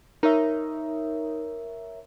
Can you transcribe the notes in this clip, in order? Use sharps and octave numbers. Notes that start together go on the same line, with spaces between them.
D#4 A#4 C#5 E5